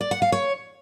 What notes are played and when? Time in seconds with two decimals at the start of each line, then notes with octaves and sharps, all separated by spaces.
0.01 D5
0.11 F#5
0.22 F5
0.32 C#5